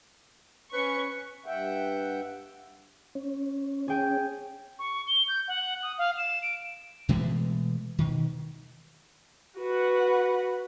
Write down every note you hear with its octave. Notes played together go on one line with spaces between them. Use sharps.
C#4 B4 C#6
G2 E5 F#5 G5
C#4
C#4 G#4 G5
C#6
G7
G6
F#5
D#6
F5
E7
D7
B2 E3 G#3 A3
B2 D#3
F#4 B4 F#5